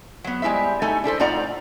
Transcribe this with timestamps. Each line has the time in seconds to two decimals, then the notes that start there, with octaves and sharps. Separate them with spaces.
0.24 F#3 B3
0.42 G3 G#3 E4 C5 E5
0.82 A3 D#4 A4 G#5
1.04 D4 E4 A4 C5
1.20 A2 D#4 F4 D5 F#5 A#5